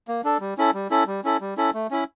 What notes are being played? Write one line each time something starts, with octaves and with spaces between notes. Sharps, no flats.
A#3
D4 A4
G3
C#4 E4 A4
G3
C#4 E4 A4
G3
C#4 E4 A4
G3
C#4 E4 A4
A3
C#4 E4